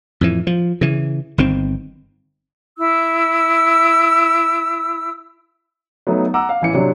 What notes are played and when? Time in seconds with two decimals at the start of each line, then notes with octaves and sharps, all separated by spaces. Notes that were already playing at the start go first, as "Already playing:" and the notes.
0.21 F2 A2 E3
0.47 F3
0.81 C#3 E3
1.38 G1 D#3 C4
2.78 E4 E6
6.07 F#3 A3 B3 D#4
6.34 F#5 A#5 D6 E6
6.49 F5
6.61 A1 E3 C#7
6.74 C3 F#3 D4